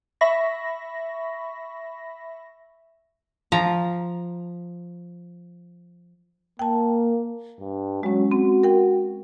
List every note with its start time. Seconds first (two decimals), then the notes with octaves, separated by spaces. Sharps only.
0.21 E5 B5 C#6 A#6
3.52 F3 F5 A#5
6.59 A#3 G5 A5
7.60 G2
8.03 F#3 G#3 C#4
8.32 C4 F#4
8.63 A#4 G5